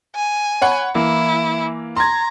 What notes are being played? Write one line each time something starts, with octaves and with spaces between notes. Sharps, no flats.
G#5
C#5 F#5 B5
E3 A#3 E4
A#5 C6 G#6